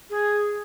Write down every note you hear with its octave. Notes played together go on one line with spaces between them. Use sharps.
G#4